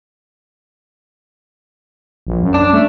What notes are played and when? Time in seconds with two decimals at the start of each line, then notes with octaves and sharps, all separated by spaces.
2.27 A#1
2.42 F#2
2.54 D4
2.73 A3